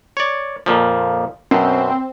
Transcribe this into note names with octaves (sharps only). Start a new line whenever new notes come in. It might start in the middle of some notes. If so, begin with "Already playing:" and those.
C#5 D5
F2 A#2 F3
F#2 B2 C4